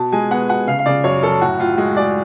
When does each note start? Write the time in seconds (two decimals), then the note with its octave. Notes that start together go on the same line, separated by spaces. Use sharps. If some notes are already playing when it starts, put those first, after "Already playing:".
Already playing: B2 A5
0.12 G#3 G#5
0.31 B3 F#5
0.49 B2 F#5
0.67 C#3 F5
0.79 F5
0.86 C#3 D5
1.04 F#2 C#5
1.23 F#2 A4
1.41 A2 F#4
1.59 A2 F4
1.78 G#3 F#4
1.97 G#3 D5